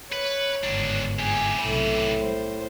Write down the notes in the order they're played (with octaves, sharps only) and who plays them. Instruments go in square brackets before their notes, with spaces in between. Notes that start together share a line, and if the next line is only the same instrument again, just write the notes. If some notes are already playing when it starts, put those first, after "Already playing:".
[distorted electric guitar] B4 [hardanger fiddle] C#5
[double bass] G1 G#2 [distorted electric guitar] D#3 D4
[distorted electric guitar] E3 G4 [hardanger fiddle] G#4
[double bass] B1 C3 [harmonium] A2 [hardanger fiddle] B5
[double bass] G3 [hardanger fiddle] C5